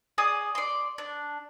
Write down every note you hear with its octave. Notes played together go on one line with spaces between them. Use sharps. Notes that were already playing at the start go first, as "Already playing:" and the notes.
G#4 D5 G#5 D#6
D5 C6
D4